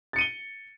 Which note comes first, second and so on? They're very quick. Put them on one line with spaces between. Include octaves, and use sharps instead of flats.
A6 C#7 D#7 G7